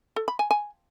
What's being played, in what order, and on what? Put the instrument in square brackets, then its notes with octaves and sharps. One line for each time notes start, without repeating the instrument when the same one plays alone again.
[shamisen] A4
B5
G#5
G#5